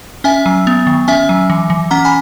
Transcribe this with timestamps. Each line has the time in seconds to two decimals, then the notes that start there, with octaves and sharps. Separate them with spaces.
0.24 C#4 E5 G#5
0.46 F#3
0.67 B3
0.87 D#3
1.08 C#4 E5 G#5
1.29 F#3
1.50 E3
1.70 E3
1.91 C#4 F#5 A#5
2.05 G#5 B5